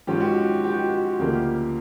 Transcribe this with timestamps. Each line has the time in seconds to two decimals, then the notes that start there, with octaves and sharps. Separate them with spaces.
0.07 G#2 F3 G#3 C#4 G4
0.20 F#4
0.34 G4
0.64 G4
0.72 F#4
0.88 F#4
1.19 D2 C#3 F3 A#3 G4